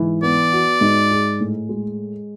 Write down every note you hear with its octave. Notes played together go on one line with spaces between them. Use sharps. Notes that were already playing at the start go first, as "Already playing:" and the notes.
Already playing: G#2 E3
B3 D5
F#4
G#2
G#4
A2
G#3